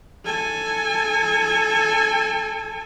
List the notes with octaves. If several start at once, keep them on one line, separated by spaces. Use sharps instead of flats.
A4 G#5